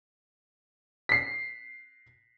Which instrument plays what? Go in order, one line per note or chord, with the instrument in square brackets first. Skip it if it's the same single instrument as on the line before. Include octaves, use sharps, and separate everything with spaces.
[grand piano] B6 C7